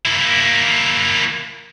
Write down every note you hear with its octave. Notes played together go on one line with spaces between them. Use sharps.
A#3 E4